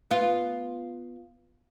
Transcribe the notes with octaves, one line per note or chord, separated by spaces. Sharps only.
B3 F4